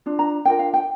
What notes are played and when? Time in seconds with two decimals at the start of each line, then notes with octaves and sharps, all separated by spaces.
0.06 D4 F4
0.19 A#5
0.45 D4 F4 A#4 G5
0.59 F5
0.74 G5